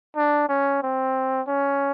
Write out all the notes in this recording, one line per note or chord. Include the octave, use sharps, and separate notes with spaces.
D4
C#4
C4
C#4